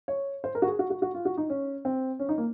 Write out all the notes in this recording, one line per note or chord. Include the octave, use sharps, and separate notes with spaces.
C#5
C5
A#4
F#4
G#4
F#4
F#4
F#4
F4
F#4
D#4
C#4
C4
C#4
D#4
A#3